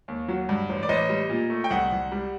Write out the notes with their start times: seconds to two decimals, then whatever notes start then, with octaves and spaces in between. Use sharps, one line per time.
0.08 D#2
0.28 F#3
0.49 G2
0.69 A1
0.83 D5
0.89 A1 D#5
1.09 G3
1.30 A#2
1.50 A3
1.64 G5
1.70 C2 F#5
1.92 C2
2.12 G3